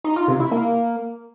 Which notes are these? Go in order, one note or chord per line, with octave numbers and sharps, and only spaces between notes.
D#4
F4
C3
E4
A#3